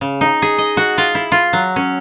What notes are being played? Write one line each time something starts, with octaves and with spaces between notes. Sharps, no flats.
C#3
D#4
G#4
D#5
F#4
F4
E4
F4
F#3
C#4